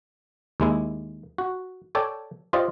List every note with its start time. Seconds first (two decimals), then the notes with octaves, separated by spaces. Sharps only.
0.60 D#2 G#3 E4
1.38 F#4
1.95 A4 C#5 D5 G5 A5
2.53 F4 G4 C5 D5 D#5